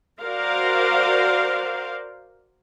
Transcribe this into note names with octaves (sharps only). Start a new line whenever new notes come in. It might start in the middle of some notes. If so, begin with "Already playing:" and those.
F#4 A#4 C5 D5 F5